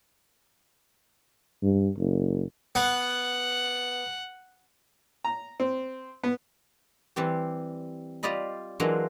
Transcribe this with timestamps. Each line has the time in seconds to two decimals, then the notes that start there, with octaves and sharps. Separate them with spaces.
1.63 G2
1.98 F#1
2.75 B3 F#5
5.25 A#5
5.60 C4
6.24 B3
7.16 E3 G3 C4 G4
8.23 G3 F4 D5 D#5 B5
8.80 E3 F#3 G#3 A#3 D4 F4